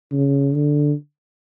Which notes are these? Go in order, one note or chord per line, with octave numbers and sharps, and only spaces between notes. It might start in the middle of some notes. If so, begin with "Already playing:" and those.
C#3
D3